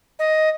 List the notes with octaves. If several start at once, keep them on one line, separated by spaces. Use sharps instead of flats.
D#5